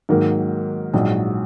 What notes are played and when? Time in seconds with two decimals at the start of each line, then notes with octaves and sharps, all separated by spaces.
0.09 G#2 D#3 F#3 A#3
0.94 A#1 G#2 F#3